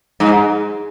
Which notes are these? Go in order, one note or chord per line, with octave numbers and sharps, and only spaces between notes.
G#2